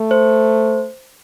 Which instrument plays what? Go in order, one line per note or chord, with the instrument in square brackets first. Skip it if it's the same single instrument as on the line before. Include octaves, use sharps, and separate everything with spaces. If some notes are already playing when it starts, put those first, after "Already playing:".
Already playing: [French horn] A3
[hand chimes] C5